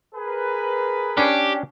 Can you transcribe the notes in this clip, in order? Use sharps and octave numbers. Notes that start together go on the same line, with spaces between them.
G#4 A#4 B4
C#4 D4 G4